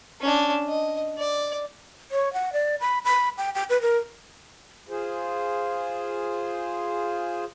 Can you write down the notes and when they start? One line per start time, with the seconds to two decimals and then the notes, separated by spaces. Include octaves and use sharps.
0.21 C#4 D4
0.68 D#5
1.18 D5
2.11 C#5
2.33 F#5
2.53 D5
2.81 B5
3.05 B5
3.38 G5
3.55 G5
3.70 B4
3.82 A#4
4.89 F4 G#4 C5